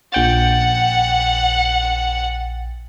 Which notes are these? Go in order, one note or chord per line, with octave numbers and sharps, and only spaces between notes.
A#1 F#5 G5 A6